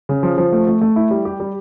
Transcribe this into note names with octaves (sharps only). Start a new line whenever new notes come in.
C#3
F3
F3
A3
A3
A3
E4
G3
G4
G3